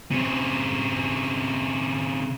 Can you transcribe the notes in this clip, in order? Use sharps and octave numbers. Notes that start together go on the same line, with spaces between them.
C#3 C4